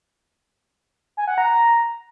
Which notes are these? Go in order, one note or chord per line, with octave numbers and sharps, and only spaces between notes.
G#5
F#5
A#5